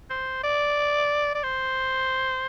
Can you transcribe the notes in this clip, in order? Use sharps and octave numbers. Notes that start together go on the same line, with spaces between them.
C5
D5
D5
C5